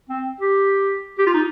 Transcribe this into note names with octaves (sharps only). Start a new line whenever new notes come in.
C4
G4
G4
F4
D#4